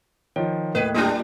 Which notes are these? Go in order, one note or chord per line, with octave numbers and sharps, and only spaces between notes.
D#3 F3 C#5
D#2 A2 A#4 B4 D#5 G5
F#3 G3 A#3 D4 F4 D5